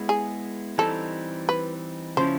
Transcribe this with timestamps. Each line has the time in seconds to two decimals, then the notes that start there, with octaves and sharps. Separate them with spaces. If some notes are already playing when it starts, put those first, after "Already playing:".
Already playing: G#3 B3 E4
0.09 G#4
0.78 E3 G3 C4 D#4 A4
1.49 B4
2.17 C#3 F3 A#3 C#4 E4 C5